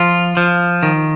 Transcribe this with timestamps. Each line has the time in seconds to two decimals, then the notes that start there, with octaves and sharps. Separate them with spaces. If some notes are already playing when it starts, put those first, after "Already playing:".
Already playing: F3 F4
0.37 F3
0.83 D#3